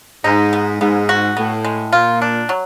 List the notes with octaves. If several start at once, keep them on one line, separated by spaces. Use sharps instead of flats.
G#2 D#4
B3
G#2 B3
F#4
A2 B3
G#3
A#2 F4
D4
F#3